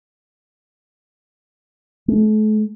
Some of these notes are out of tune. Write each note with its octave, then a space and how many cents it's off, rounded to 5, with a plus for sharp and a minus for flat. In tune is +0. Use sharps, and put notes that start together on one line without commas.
A3 -40